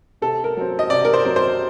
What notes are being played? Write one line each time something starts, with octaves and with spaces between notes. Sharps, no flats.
C3 A4
A#4
F#3 C4
D#5
C3 D5
A#4
C5
F#3 C4
C5